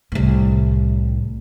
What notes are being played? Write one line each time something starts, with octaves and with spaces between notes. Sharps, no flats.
C2 A2